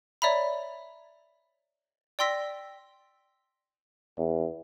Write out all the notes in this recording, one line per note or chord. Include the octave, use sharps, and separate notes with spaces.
C#5 D5 E5 A#5 B5
D5 G5 C6 E6 A#6 B6
E2